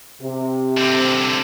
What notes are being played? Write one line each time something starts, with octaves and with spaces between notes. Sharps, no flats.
C3
D3 C4